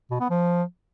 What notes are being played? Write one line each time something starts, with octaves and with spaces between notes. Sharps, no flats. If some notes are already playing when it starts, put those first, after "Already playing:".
B2
B3
F3